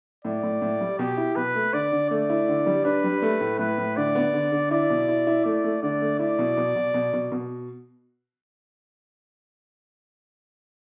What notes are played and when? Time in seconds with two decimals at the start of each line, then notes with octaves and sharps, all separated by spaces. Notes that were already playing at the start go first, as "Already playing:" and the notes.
0.25 A2 D5
0.43 A2
0.62 A2
0.81 G3
0.99 B2 G4
1.17 E4
1.36 B2 B4
1.55 A3
1.73 D3 D5
1.92 D3
2.10 A3 D5
2.30 E4
2.48 D3
2.66 G3
2.85 D4 B4
3.04 G3
3.22 A3
3.41 A2
3.59 A2 B4
3.78 A2
3.97 D3 D5
4.15 B3
4.34 D3
4.52 D3
4.71 E4 D5
4.90 B2
5.08 E4
5.27 E4
5.45 A3 D5
5.64 A3
5.82 D3 D5
6.01 A3
6.19 E4 D5
6.39 B2
6.57 B2
6.76 B2
6.94 B2
7.13 B2
7.32 B2